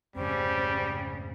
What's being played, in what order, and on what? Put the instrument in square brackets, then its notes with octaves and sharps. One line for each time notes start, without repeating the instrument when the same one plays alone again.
[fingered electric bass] F2 G#2 A3 [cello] C#3 [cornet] G3 [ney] C5